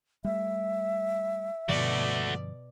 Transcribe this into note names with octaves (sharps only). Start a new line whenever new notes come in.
G3 A3 E5
G2 B2 D3 F3 A3 F#4 D5